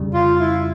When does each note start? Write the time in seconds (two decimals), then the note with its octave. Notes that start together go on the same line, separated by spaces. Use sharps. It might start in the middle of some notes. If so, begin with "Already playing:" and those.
Already playing: F2 C#3 G3
0.14 F4
0.40 E4